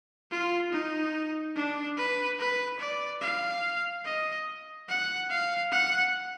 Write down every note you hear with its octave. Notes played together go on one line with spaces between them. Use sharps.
F4
D#4
D4
B4
B4
D5
F5
D#5
F#5
F5
F#5